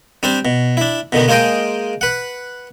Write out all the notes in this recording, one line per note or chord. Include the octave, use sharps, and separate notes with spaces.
G3 C4 D4 C5
B2
D4 E4
B2 D3 D#3 B3
G#3 A#3 G#4 C5 D#5 G5
B4 F#5